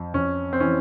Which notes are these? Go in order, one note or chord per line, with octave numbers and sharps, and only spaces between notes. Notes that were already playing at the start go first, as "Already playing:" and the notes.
Already playing: F2
F2 C#4
C4
E3 C#4